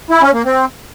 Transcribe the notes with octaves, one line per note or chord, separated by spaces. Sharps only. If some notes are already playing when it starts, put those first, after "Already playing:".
E4
C#4
A#3
C4